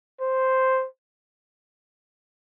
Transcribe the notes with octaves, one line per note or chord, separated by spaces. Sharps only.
C5